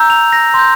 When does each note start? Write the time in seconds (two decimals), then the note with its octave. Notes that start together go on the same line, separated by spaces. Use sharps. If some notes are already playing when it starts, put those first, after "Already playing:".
Already playing: A#5 E6 G6
0.10 F7
0.33 A#6
0.54 C6 G6